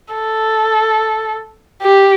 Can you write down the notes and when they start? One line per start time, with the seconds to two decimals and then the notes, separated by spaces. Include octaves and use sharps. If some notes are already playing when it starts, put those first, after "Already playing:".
0.14 A4
1.82 G4